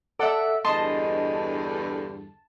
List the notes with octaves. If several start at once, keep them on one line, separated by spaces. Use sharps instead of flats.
A4 D5 E5 F#5
E2 G2 D3 D#5 A5 C6